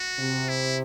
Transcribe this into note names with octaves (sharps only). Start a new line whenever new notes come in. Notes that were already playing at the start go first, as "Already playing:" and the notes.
Already playing: F#4
C3
E4